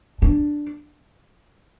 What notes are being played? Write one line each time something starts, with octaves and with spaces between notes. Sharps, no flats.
D4